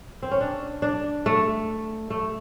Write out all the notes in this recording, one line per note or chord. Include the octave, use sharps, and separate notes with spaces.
C4
C#4
D4
D4
A3
A3